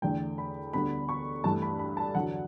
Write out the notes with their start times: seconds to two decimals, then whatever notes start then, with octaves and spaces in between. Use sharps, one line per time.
0.02 E2 D3 A3 G5
0.38 B5
0.73 D2 D3 G3 B3 B5
1.09 C#6
1.44 G2 E3 A3 A5
1.62 B5
1.79 B5
1.97 A5
2.15 E2 D3 F#3 F#5